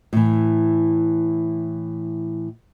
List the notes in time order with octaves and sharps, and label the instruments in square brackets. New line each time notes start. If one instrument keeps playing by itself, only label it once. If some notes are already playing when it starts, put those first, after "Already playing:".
[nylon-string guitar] A2 E3